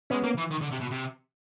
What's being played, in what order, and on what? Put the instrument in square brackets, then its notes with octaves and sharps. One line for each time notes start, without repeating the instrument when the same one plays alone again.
[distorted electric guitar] G#3 [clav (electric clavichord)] B3 C#4
[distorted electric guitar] A#3
E3
D#3
D3
C3
B2
C3